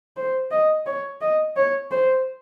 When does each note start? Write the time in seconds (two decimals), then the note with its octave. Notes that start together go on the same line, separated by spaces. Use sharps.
0.17 C5
0.51 D#5
0.86 C#5
1.21 D#5
1.56 C#5
1.91 C5